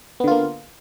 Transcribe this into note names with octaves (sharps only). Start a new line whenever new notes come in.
D3 A#3 B3 F4